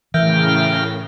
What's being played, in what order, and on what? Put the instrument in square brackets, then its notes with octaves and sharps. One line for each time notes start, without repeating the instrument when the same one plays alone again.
[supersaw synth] A2 C#3 [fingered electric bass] E3 [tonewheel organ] A#4 G5 F6 [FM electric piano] E5 G6